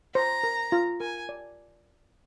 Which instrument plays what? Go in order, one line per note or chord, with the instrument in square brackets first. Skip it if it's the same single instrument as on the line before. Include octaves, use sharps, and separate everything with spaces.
[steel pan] C5 [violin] A#5
[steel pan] A#4
F4
[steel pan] A#4 [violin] G#5
[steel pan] D5